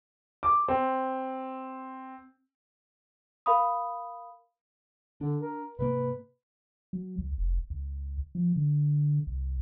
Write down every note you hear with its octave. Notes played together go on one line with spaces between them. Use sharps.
D6
C4
A#4 F5 B5 D#6
D3 D4
A#4
G#2 C3 A#3 B4
F#3
C#2
F1
C#2
F3
D3
C2